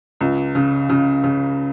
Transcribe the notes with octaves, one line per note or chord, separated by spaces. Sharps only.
C#2
C#3
C#3
C#3